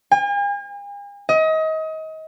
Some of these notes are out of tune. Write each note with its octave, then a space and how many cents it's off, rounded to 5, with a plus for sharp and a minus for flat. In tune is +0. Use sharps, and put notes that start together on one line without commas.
G#5 -45
D#5 +30